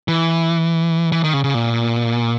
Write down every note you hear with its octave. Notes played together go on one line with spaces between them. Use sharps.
E3
E3
D#3
C#3
C#3
A#2